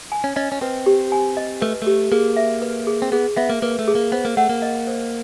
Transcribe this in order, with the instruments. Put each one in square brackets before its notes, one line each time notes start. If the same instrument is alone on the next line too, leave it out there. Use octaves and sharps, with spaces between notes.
[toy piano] G#5
[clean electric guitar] C#4
[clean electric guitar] C#4 [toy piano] D#5
[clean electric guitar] C#4
[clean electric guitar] C4 [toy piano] B4
[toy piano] G4
G#5
D#5
[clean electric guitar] A3 [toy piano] B4
[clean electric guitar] A3 [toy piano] G4
[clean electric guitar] A#3 [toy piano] G#4
[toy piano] E5
B4
G#4
[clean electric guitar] C4
[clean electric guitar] B3 [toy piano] G#4
[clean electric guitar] B3 [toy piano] E5
[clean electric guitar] A#3
[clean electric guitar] A#3 [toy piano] B4
[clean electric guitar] A3
[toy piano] G#4
[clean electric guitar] A#3
[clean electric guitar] B3 [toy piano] C5
[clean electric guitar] A#3
[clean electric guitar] A3 [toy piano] F#5
[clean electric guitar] A#3
[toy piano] D#5
C5